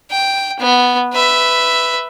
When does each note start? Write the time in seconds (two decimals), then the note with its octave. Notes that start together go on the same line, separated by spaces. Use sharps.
0.11 G5
0.60 B3
1.13 B4 E5